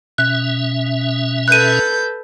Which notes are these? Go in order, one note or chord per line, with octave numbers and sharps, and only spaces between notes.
B2 C#4 E5 F#6
A4 B4 F#6 G6 D#7